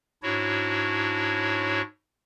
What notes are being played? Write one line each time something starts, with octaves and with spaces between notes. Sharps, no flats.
G#2 D4 E4 F#4 C#5